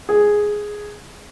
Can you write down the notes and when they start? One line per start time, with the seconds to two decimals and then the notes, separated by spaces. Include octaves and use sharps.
0.09 G#4